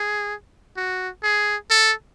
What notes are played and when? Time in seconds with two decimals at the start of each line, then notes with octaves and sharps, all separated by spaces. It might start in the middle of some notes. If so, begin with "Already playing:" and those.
Already playing: G#4
0.77 F#4
1.23 G#4
1.71 A4